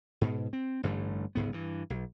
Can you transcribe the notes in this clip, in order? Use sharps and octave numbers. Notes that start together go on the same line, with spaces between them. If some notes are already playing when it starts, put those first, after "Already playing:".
G#2 B2
C4
A1 G2 D3 A3
G1 C#2 G#2 B3
G2 E3
B1